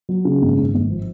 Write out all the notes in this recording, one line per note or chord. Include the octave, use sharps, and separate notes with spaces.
F#3
C#3
G#1
G#1
G#1
F3